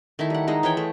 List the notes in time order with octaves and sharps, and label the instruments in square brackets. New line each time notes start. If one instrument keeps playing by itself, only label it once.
[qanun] D#3 A3 E4
G3 F#5
G#3 D#4
E3 G#3 C#5 G5
A3